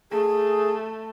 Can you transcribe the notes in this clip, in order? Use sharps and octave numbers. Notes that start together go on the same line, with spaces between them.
A3 G#4